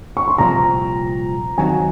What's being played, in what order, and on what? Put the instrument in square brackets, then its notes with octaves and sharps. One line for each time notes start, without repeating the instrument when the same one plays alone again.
[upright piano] C#6
C6
[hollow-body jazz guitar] C2 A#2 F3 C4 [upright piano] A#5
[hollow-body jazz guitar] D#2 D#3 F#3 C4 F#4 [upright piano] G#5